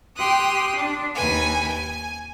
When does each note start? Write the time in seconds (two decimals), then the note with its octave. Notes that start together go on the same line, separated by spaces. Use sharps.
0.16 G4 G5 C6 D#6 F#6
0.74 D4
1.15 D#2 B4 G#5
1.66 G#5